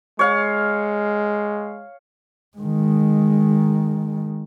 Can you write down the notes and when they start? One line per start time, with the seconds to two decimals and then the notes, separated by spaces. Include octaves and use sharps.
0.19 G#3 C#5 F5
2.57 D#3 G#3